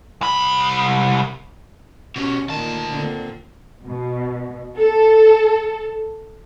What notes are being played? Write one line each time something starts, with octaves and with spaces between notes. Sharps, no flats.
C2 B5
B2 C#4 G4
D2 A#2 D#3 A5
A#2 D3 C4
B2
A4